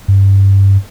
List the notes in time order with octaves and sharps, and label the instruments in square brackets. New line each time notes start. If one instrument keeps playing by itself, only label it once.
[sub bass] G2